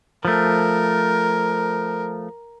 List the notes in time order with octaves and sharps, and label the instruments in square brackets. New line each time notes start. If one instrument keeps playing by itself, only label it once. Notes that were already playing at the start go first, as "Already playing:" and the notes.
[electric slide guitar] F3 A3 [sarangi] A#4